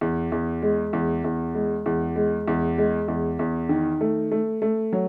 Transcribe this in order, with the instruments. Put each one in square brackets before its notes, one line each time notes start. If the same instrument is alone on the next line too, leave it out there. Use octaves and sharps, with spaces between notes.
[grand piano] E2
E2
G#3
E2
E2
G#3
E2
G#3
E2
G#3
E2
E2
D#3
A3
A3
A3
F#3